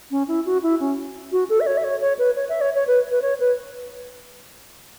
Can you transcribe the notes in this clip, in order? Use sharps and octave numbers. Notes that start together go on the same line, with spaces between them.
C#4
E4
F#4
E4
C#4
F#4
A4
E5
C#5
E5
C#5
C#5
B4
C#5
E5
C#5
C#5
B4
B4
C#5
B4